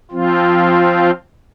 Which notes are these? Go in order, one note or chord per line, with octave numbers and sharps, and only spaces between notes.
F3 C4 F4